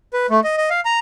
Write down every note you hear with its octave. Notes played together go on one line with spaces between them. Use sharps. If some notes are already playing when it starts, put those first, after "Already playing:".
B4
A3
D#5
D#5
F5
A#5